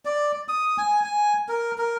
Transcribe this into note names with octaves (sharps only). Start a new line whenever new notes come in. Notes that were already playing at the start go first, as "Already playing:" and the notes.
D5
D#6
G#5
G#5
A#4
A#4